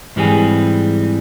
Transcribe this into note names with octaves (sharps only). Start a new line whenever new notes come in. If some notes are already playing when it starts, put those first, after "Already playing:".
G#2 E3 G3 C4 G#4